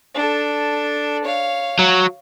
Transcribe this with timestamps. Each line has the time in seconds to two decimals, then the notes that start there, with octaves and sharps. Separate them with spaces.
0.14 D4 A4
1.24 C#5 F5
1.79 F#3